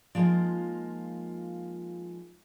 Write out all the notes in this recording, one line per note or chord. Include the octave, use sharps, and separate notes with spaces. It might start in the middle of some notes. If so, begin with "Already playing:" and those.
F3 G#3 A#3 D#4 F4